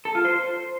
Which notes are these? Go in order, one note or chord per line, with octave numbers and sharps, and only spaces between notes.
A4
F4
C5